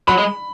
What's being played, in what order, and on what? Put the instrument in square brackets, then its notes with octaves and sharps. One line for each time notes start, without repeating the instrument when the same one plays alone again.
[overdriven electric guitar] F#3 [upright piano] B5
[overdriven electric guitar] G#3